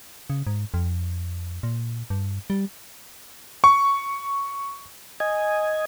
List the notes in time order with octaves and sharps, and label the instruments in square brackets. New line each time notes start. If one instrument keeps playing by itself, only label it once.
[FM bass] C#3
G#2
F2
A#2
G2
G3
[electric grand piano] C#6
[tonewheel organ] D#5 G#5